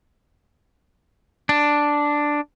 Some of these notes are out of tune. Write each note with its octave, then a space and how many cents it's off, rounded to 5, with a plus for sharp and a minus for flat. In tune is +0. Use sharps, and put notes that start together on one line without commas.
D4 +0